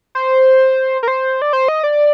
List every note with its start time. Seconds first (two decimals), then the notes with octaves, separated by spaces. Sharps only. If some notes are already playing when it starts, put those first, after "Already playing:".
0.15 C5
1.03 A#4
1.08 C5
1.42 D5
1.53 C5
1.68 D#5
1.83 D5